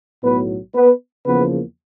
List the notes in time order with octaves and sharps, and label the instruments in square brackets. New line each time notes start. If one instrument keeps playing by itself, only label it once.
[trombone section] B1 A2 F#3 B3 B4
B3 B4
E2 C#3 F3 A#3 B3 B4